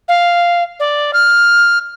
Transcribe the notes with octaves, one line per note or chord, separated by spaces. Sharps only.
F5
D5
F6